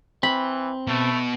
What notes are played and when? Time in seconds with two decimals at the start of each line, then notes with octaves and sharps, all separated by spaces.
0.23 E3 C4 B5
0.88 B2 A3